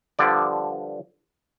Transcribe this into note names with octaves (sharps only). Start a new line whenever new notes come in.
G2 D3 F3 D5